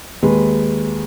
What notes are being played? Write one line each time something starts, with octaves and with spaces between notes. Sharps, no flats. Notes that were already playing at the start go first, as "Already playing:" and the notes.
D#2 G#3 B4